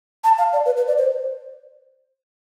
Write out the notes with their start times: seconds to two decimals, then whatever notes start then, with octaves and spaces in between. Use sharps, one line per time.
0.24 A5
0.38 F5
0.53 D5
0.66 B4
0.77 B4
0.88 D5
0.98 C5